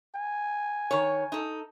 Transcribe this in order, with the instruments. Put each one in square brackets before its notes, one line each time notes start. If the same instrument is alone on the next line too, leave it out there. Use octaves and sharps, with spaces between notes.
[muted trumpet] G#5
[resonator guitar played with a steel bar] D#3 C#5
D#4 A4